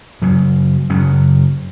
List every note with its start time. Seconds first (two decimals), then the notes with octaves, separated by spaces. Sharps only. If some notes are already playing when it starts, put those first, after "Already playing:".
0.22 F#2 C#3 F#3
0.90 F#2 C#3 F#3